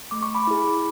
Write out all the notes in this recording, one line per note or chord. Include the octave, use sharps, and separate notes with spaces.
A3 D6
C#6
B5 D6
E4 G#4